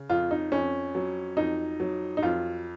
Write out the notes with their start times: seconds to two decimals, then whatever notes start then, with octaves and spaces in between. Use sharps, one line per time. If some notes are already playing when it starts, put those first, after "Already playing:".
Already playing: C#3
0.10 F2 F4
0.31 D#4
0.52 F2 C#4
0.95 F#3
1.37 F2 D#4
1.80 F#3
2.17 D#4
2.23 F2 F4